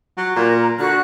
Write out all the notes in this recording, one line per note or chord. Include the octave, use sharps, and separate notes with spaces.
F#3
A#2 A#4 A#5
D3 F#4 F#6